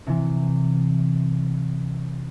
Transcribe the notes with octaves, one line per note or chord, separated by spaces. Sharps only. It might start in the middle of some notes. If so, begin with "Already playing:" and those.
C3 E3